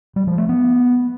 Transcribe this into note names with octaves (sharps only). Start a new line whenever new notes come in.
G3
F3
A3
B3